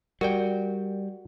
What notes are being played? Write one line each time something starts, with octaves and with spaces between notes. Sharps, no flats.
G3 F#4 A#4 D5 G5